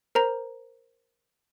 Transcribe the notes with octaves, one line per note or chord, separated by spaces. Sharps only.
A#4 C5 A#5